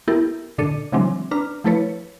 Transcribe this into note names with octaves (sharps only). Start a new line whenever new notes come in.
B3 E4 G4 A4 A#4
A#2 D3 D4 A4 C#7 D#7
C#3 E3 F#3 G#3 C4 D4
D4 B4 A#5 F6
F3 A3 E4 A4 B4 C#5